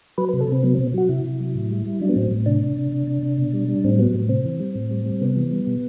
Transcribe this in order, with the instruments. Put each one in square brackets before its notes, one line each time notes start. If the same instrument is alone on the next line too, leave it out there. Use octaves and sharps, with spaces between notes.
[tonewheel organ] F#3 B4
C3 B4
A4
C3 C4
F#3 B3
B2 C4
F#3 F#4
C3 E4
C3
F#3
A2
G3
G3
F#3 D4
B3
A2 C4
A2
C3 D4
C3
C3
C3
C3
C3
B2
G3
G3
A2 C4
F#3 B3
A2
C3 C4
E3
G3
A2
G3
G3
C3 B3
E3
G3
B2